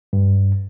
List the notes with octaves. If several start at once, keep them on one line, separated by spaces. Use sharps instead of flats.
G2